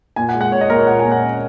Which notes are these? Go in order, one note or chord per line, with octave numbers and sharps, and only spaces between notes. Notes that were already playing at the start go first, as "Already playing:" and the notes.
A#2 G#5
F#5
G#3
F#5
A#2 C#5
D#5
A#2 A#4
C#5
A#2 F#5
G#5
A#2
F#5
C#4